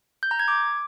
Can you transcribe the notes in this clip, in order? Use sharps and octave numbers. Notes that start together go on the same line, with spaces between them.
G6
A#5
G#6
D6